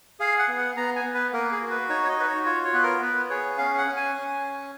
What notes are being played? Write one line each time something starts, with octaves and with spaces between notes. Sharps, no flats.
G#4 F5
F#5
B3
F#5
B3 A#5
G#5
B3
B4
A#3 A#4
G#4
F#4
B4
D#4 C#5
C#5
D#5
F#4 B4
C#5
F4 C#5
C#5
B3 B4
A#4
B3 B4
G#4 C#5
C#4 F5
F#5
C#4
G#5
C#4